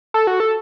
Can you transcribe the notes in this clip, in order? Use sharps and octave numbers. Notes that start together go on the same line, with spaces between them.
A4
F#4
A4